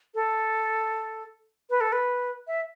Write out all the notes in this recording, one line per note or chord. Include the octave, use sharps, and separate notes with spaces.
A4
B4
A4
B4
E5